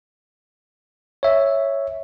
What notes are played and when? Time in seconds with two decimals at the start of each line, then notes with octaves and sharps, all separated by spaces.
1.23 C#5 E5